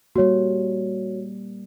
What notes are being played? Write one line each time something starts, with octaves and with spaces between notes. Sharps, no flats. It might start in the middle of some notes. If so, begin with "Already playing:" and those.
G3 A#3 F#4 C#5